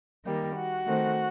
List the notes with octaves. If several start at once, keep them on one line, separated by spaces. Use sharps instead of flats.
D#3 G3 A#3
F#4
D#3 A3 C4